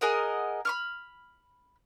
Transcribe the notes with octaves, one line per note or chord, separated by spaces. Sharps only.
G#4 A#4 D#5 F#5
B5 C#6 F6